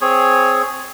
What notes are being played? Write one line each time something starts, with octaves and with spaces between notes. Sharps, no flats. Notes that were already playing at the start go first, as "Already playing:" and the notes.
C4 G#4 C#5